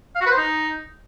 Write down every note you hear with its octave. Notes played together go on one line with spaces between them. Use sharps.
F5
F#4
B4
C5
D#4